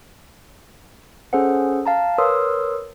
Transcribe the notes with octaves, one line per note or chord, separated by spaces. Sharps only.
C#4 G#4 A4 C5 F#5
F5 A5 A#5
A#4 B4 C#5 C6 D#6 E6